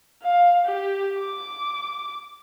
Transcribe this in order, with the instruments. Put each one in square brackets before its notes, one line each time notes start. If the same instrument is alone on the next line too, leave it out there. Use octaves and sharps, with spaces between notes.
[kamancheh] F5
G4
D6